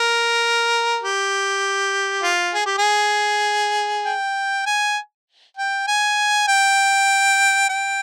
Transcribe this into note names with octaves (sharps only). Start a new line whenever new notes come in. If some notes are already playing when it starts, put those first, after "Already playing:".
Already playing: A#4
G4
F4
G#4
G4
G#4
G5
G#5
G5
G#5
G5
G5